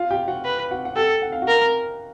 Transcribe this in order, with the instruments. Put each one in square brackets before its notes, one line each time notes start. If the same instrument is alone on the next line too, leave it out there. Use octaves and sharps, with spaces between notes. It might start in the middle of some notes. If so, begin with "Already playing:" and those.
Already playing: [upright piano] F4 F5
G4 G5
F#4 F#5
[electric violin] B4
[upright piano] F#4 F#5
F#5
[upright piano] G4 G5 [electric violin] A4
[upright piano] F#5
F5
F#4 F#5
[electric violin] A#4